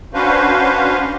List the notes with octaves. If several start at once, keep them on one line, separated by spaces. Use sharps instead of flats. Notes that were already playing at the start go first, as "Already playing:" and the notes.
C#4 D4 F#4 B4 C5 F5